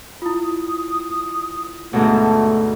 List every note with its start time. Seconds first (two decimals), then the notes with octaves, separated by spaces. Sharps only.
0.22 E4 F4 D#6
1.93 D2 G#2 B2 A3 A5